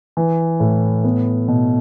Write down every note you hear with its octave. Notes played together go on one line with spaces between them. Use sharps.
E3
A2
B3
B2